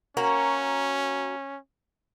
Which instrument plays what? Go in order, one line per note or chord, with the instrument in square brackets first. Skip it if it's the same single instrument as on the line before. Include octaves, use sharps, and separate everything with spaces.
[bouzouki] A#3 F#4 A#4 [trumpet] C#4